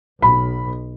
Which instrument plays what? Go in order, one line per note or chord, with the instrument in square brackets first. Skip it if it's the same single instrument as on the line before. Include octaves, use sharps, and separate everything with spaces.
[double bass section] B1 [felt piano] B5